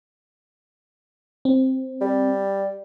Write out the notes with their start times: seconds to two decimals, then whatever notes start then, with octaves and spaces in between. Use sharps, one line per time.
1.45 C4
2.01 G3